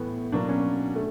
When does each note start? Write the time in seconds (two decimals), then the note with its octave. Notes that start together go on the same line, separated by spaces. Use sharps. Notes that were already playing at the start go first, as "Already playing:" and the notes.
Already playing: A2 E3 A3 B3
0.32 B2 F#3 A#3 D4
0.49 C#4
0.96 A3